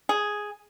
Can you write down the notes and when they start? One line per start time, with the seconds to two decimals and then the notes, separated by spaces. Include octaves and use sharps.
0.09 G#4